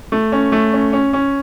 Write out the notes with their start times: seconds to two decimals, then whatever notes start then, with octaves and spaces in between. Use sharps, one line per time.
0.12 A3
0.32 C#4
0.52 A3
0.73 C#4
0.93 C#4
1.13 C#4